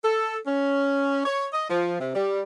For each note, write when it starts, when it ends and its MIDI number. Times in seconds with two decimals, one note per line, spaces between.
0.03 0.37 69
0.47 1.25 61
1.25 1.46 73
1.52 1.67 75
1.69 1.99 53
2.00 2.14 48
2.15 2.42 55